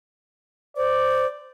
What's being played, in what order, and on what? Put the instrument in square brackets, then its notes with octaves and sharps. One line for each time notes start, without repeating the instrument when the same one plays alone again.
[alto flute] C5 [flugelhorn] D5